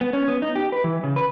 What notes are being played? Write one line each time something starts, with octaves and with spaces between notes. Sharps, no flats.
B3
C#4
B3
D#4
G4
B4
E3
C#3
B4